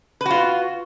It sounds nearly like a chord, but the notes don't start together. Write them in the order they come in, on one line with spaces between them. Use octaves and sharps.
B4 F#4 F4